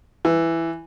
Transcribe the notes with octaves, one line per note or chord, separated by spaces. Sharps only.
E3